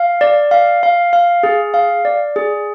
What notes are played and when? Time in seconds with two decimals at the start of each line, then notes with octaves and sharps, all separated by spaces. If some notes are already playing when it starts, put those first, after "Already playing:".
Already playing: F5
0.21 D5
0.51 F5
0.83 F5
1.13 F5
1.43 G#4
1.74 F5
2.05 D5
2.36 G#4